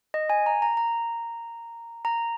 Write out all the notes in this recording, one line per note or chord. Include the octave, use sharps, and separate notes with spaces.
D#5
G#5
A#5
A#5
A#5
A#5